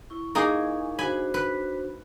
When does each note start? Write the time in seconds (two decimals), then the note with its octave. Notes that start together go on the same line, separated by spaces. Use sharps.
0.10 E4 C#6
0.35 A#3 D#4 G#4
0.99 D4 F#4 C5 G#5 B5
1.34 B4